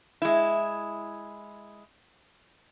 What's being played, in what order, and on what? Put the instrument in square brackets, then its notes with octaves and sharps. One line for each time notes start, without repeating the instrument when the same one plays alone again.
[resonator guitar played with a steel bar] G#3 E4